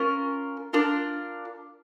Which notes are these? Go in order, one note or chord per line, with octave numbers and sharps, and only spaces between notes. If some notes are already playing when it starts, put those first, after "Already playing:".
Already playing: C#4 F4 A#4
D4 F4 A#4